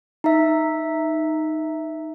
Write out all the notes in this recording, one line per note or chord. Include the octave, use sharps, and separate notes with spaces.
D#4 E5